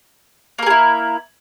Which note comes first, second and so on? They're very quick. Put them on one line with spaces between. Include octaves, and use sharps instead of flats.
A#3 A#4 G#4 E4